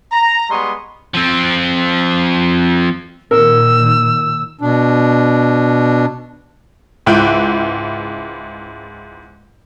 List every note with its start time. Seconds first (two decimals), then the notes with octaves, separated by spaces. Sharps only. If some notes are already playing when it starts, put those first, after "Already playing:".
0.12 A#5
0.50 G3 G#3 B3 C6 C#6 D#6
1.14 F3 C4
3.31 A#2 D#3 A#4 E6
4.61 B2 D4
7.06 C#2 G#2 E4 G5 F#6